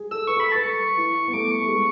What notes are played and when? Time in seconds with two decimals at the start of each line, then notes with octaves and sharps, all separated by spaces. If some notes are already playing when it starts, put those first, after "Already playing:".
Already playing: G#4
0.11 A4 E6
0.27 B4 C#6
0.37 A4 B5
0.52 B4 A5
0.63 A4 C#6
0.97 E4
1.28 B3
1.33 A3 D6
1.51 C#6
1.62 A3
1.68 G#3